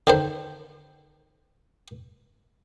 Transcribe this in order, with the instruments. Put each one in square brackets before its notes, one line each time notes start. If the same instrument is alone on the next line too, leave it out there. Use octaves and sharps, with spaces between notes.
[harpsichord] D3 D#3 C5